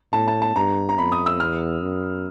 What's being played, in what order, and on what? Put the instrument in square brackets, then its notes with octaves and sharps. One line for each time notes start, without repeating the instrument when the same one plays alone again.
[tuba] A2 [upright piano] A5
[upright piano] A5
A5
[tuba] G2 [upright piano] A#5
[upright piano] A#5
[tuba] F2 [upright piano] B5
[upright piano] D#6
E6
[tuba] E2 [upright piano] F6
[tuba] F#2